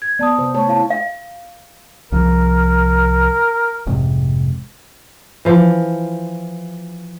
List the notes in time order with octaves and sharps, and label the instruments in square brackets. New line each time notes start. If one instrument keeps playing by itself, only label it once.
[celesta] G#6
[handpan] B3 [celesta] D5 A5 D#6
[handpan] C3 C5
[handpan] A3 C#5 [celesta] A5 C#6
[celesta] E4 F5 A5
[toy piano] F5
[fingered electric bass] C2 F3 [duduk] A#4
[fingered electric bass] F1 G#2 C3
[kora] E3 F3